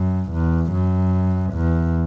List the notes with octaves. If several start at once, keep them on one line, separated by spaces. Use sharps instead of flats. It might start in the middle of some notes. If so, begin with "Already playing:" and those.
Already playing: F#2
E2
F#2
E2